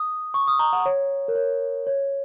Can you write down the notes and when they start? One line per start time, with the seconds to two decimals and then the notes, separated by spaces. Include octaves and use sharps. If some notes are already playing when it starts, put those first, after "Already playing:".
Already playing: D#6
0.34 C#6
0.47 D#6
0.59 A#5
0.73 F#5
0.86 C#5
1.28 A#4
1.35 C#5
1.87 C#5